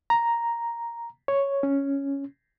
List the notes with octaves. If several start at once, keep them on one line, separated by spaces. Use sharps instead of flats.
A#5
C#5
C#4